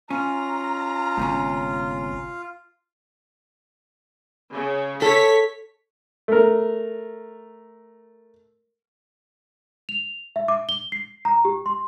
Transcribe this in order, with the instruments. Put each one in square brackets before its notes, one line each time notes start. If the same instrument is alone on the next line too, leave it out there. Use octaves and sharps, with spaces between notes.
[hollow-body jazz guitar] C#4 [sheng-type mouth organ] F4 [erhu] A#5
[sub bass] G1 [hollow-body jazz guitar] G#2 C3 C#4
[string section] C#3
[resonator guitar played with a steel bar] A4 [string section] C#5 B6
[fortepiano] A3 A#4
[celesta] F7
E5
D6
G7
C7
A#5
G4
C6